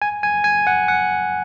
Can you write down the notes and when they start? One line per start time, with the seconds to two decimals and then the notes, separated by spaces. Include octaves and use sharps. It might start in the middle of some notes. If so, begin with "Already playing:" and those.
0.02 G#5
0.23 G#5
0.44 G#5
0.67 F#5
0.88 F#5